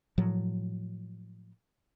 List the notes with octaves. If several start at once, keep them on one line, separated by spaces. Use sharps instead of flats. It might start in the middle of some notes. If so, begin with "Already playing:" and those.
A2 F3 F#3